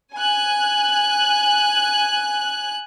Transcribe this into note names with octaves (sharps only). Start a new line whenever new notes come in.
G#5 F#6